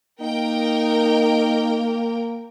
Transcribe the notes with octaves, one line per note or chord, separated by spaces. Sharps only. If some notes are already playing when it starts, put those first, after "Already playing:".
A#3 D#4 A#4 G5